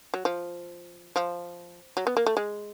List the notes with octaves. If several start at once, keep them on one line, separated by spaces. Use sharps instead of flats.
F#3
F3
F3
F#3
B3
A#3
A3
G#3